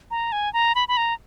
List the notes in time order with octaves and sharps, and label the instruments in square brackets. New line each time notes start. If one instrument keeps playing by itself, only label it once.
[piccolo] A#5
G#5
A#5
B5
B5
A#5